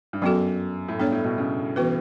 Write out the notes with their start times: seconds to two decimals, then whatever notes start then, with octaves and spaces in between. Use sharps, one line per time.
0.13 G2
0.22 F#2 F#3 B3 F#4 A4
0.88 A2
0.99 G2 B3 D4 A4 C#5
1.12 A2
1.24 B2
1.38 C#3
1.76 E3 B3 F#4 B4